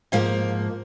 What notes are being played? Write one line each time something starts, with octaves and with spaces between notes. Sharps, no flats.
G#2 F3 A#3